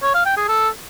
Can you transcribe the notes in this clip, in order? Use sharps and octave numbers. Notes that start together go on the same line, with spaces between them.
C#5
F5
G5
G#4
A4